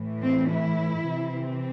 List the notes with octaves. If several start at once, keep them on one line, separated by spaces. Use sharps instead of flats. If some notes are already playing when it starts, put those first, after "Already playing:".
Already playing: A2 E3
C4
E4
C3 E3 C4